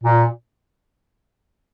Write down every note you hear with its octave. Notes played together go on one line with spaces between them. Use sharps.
A#2